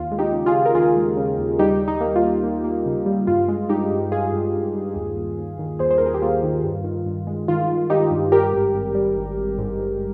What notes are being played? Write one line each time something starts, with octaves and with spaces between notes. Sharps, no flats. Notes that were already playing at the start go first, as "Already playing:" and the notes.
Already playing: D#2 F4
G#3
D#4 G4
C#3
F4 G#4
C#3
A#4
D#2 F4 G#4
G#3
C#3
D#2
G3 D#4 G4
G3
D#4
A#3
F4
A#3
A#3
A#3
C#3
G3
G2 F4
G#3
G2 D#4 G4
G2
G2 F4 G#4
G2
G2
G2
D#2
D#2
D#2
D#3
D#2 G#4 C5
C5
D#2 A#4
G#4
G4
A#3 F4
D#3
G2
D#3
G2
G#3
D#3 F4
D#3
D#3 D#4 G4
G2
G3 G4 A#4
G#1
G#1
G3
G#1
G#1
G#2
G#2